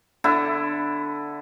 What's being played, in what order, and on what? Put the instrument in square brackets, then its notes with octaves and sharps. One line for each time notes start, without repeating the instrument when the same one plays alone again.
[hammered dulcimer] D3 E4